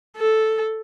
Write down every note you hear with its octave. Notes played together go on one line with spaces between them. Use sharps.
A4